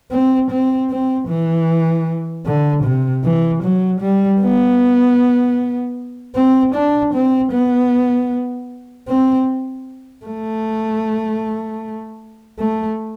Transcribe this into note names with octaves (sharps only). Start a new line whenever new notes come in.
C4
C4
C4
E3
D3
C3
E3
F#3
G3
B3
C4
D4
C4
B3
C4
A3
A3